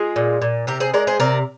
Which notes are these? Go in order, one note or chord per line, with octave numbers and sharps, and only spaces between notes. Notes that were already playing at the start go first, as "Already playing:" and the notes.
Already playing: G#3 F4 G#4
A#2
A#2
C3 G4 A#4
G#4 C5
G#3 A#4 D5
G#4 C5
C3 A#4 D5